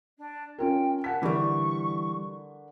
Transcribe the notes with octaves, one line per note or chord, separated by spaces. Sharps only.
D4
C#4 F4 A#4 G5
A#4 F#5 A5 B6
D3 E3 G3 A#4 C#6